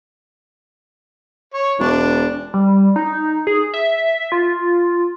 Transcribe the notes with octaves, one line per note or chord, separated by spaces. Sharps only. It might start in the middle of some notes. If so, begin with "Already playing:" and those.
C#5 C#6
E1 D4
G3
D#4
G#4
E5
F4